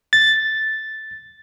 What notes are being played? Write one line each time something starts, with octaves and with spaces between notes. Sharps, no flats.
A6